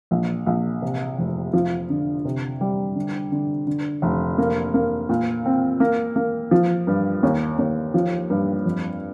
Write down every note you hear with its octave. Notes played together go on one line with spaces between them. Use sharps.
A#1
A#1
C3
F1
F3
D3
C3
G3
D3
D3
D3
F1
A#3
A#3
A#2
C4
A#3
A#3
F3
G2
D#2
D#2
F3
G2
F2